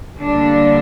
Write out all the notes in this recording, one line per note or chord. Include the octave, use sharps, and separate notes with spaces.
D3 G3 A#3 D4